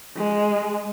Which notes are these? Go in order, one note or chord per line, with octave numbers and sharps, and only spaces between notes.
G#3